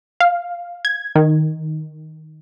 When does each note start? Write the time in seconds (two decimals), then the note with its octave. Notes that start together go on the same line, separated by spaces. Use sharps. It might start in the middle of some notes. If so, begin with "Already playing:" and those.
0.20 F5
0.85 G#6
1.16 D#3